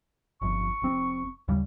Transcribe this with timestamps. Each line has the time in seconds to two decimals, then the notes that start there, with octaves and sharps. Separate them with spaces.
0.42 G1 F2 C#6
0.82 F1 C4
1.48 D#2 C#3 G3